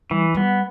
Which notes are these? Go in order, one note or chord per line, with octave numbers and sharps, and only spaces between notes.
E3 G3
G3 B3